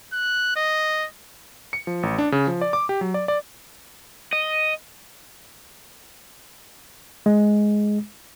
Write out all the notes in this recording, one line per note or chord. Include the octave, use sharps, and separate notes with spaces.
F#6
D#5
C#7
F3
A1
D4
C#3
F3
D5
D6
G4
F#3
D5
D5
D#5
G#3